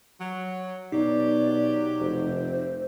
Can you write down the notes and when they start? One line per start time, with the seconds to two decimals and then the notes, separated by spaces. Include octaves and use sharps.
0.19 F#3
0.92 B2 F#3 D#4 G4 D5
2.00 F1 C5